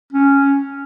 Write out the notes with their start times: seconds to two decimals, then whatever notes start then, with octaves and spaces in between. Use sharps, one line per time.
0.13 C#4